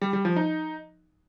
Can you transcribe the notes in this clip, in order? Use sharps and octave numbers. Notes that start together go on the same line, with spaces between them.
G3
G3
F3
D#4